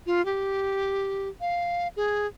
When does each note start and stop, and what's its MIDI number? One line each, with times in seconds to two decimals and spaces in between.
0.06 0.24 65
0.25 1.29 67
1.41 1.88 77
1.97 2.27 68